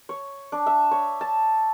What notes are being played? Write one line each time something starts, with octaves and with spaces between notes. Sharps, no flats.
C#5
D4
E5
C#5
A5